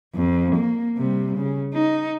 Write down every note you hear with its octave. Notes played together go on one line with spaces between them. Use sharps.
F2
A#3
C3 G3
C#3
D#4